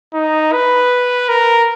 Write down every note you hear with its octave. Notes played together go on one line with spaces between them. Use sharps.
D#4
B4
A#4